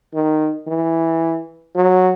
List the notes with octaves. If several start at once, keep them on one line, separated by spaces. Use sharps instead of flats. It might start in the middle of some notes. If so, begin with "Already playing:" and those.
D#3
E3
F#3